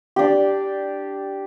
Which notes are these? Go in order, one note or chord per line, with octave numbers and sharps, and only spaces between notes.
D4 G4